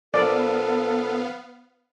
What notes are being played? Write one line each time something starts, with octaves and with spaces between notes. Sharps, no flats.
A#1 B3 A4 D5 F5